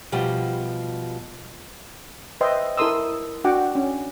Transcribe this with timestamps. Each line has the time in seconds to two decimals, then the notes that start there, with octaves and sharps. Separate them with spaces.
0.12 B2 F3 G3 G4
2.41 B4 C5 D#5 E5 G5 C6
2.78 E4 A4 A#4 C6 D#6 E6
3.44 D4 F#4 F#5 G5 D6
3.75 C#4